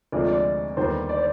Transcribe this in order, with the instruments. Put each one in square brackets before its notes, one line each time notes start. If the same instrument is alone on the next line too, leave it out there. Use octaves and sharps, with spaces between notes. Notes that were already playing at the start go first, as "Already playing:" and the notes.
[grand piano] D2 C3 F3 G#3 C4 [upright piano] D5
[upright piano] D5
[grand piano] D#2 D3 G3 B3 [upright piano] C5
[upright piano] D5
C5